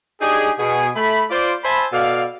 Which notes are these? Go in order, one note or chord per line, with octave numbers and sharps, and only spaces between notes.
D4 D#4 G4 G#4
B2 G#4
A3 B5
F4 C5 D5
C5 E5 G#5 A5 B5
B2 A4 D5 F5